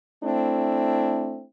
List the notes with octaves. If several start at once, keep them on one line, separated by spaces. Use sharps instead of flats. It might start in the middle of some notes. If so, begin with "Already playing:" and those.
A3 C4 D4 E4